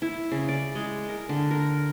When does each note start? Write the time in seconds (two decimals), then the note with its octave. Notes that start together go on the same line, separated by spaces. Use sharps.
0.02 E4
0.32 C#3
0.49 D5
0.75 G#3
1.09 A#4
1.29 D3
1.51 A#4